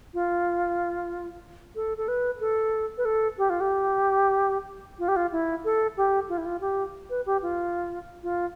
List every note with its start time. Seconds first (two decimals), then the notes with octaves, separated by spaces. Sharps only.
0.14 F4
1.76 A4
1.98 A4
2.08 B4
2.41 A4
2.98 B4
3.05 A4
3.38 G4
3.50 F4
3.61 G4
4.99 F4
5.08 G4
5.16 F4
5.32 E4
5.65 A4
5.97 G4
6.29 F4
6.38 E4
6.46 F4
6.61 G4
7.10 B4
7.26 G4
7.42 F4
8.23 F4